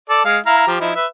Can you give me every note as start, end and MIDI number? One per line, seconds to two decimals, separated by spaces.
0.10 0.21 69
0.10 0.21 74
0.25 0.38 56
0.25 0.38 77
0.46 0.67 64
0.46 0.67 77
0.46 0.67 82
0.67 0.76 53
0.67 0.76 67
0.80 0.92 53
0.80 0.92 63
0.80 0.92 64
0.95 1.06 71
0.95 1.06 76